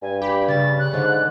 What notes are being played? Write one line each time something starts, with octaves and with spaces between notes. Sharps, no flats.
G2 G#5
G4 B5
C#3 A6
F#6
G#2 D3